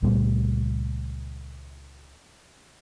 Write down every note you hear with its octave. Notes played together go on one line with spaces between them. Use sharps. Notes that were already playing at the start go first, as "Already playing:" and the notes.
C#2 A#2 G3 A3